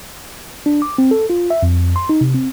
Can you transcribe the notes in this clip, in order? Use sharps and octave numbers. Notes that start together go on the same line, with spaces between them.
D4
D6
C4
A4
F4
E5
F2
C6
D#4
C3
C4